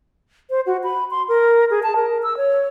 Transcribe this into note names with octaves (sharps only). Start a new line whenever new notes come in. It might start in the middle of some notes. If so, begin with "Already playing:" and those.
C5
F#4
B5
C6
A#4
G#4
A5
A#4
E6
C#5